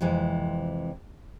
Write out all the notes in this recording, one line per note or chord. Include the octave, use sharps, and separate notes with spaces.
F2 C3 E3 G#3